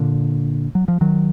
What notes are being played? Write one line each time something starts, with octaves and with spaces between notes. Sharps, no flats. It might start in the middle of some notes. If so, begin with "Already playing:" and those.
Already playing: A#2 D3
F#3
F3
D#3 F#3